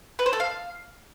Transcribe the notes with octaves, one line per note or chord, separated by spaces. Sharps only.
B4
C5
A4
F5